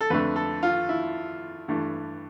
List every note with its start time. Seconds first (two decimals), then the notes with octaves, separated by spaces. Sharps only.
0.01 A4
0.10 F2 D3 A3 B4
0.36 A4
0.63 F4
0.89 E4
1.68 G2 E3 A3